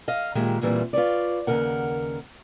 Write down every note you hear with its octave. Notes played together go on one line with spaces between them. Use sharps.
D#5 F5
A#2 D#3 G#3 G4 E5
E2 A#2 E3 G3 C4
F4 B4 C#5 D5
D#2 C#3 A#4 F#5